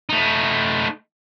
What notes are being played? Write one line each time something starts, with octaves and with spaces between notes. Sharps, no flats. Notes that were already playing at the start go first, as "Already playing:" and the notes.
A3 D#4